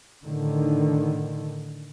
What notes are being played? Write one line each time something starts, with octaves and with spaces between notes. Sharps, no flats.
A2 D3 D#3